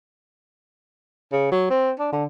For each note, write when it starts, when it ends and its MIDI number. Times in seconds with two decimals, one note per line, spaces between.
1.32 1.48 49
1.52 1.69 54
1.70 1.91 60
1.99 2.11 62
2.12 2.25 50